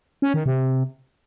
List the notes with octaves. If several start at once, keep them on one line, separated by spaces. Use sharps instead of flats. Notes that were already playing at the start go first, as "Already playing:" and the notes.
C#4
D#3
C3